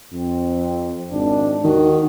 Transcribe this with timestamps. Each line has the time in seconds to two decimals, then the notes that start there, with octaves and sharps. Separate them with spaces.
0.12 F2 C4
1.11 G#1 D4
1.64 D#2 D#3 F#4